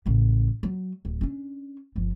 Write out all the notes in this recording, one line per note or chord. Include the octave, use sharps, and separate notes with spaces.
A1 C#3
F#3
D1
C#4 D4
G1 F3